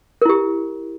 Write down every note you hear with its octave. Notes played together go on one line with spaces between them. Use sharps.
E4 G4 A#4